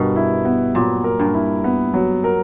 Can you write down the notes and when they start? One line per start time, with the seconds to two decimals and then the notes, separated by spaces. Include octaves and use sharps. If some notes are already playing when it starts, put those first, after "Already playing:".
Already playing: G2 B2 A#4
0.16 E4
0.45 B3
0.75 A#2 F#3
1.04 A#4
1.19 G2
1.34 E4
1.64 B3
1.94 F#3
2.24 A#4